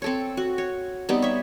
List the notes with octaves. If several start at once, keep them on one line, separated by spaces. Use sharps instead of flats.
C4 A4 C#5
F#4
C#5
G3 B3 C4 D#4
C#5 E5